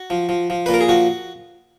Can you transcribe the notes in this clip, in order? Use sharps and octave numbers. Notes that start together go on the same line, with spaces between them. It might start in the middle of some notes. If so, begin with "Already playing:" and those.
Already playing: F#4
F3
F3
F3
A#2 B4
A#4
G#4
F3 F#4